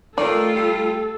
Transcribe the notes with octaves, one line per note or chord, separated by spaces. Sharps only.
D#3 A3 F4 A4 D5
G3